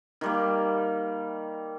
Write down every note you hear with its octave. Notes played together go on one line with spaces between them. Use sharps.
D#3 G3 A#3